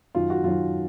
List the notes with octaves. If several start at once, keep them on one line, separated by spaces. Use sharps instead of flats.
F#2 D#3 F#3 F4
F#4
F#2 D#3 F#3 F4